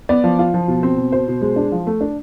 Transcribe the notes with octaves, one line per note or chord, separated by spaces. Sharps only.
B3 D5
F3
F4
F3
B2
C4
B2
B2 C5
B2
G#3
D4
F3
A3
D4